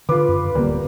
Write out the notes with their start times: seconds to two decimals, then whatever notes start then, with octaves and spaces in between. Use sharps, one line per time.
0.09 D3 F4 B4 D6
0.28 F#2
0.55 D1 D3 G3 A#3 B3